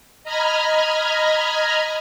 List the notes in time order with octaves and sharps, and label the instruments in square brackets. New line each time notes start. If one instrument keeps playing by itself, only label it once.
[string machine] D#5 A#5 B5 F6 G#6